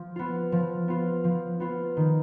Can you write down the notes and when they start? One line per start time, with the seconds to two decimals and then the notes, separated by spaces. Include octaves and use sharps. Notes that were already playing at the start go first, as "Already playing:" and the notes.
Already playing: F3
0.16 B3 F4
0.52 F3
0.88 B3 F4
1.24 F3
1.60 B3 F4
1.97 D#3